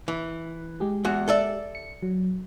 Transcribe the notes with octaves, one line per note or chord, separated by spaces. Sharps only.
E3
G#3 G4 G#4
E2 F#4
A4 D5 E5
C#7
F#3